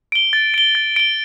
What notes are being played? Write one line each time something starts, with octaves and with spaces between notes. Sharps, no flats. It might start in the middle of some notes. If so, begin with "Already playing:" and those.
D7 G7
A6
D7 G7
A6
D7 G7